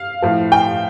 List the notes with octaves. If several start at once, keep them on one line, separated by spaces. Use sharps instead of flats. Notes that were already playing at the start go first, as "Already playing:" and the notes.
Already playing: F5
A2 F3
G5